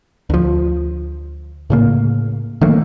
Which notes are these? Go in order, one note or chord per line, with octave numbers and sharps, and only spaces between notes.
D2 F3
A2 C#3 A#3
D#3 F#3 A3 A#3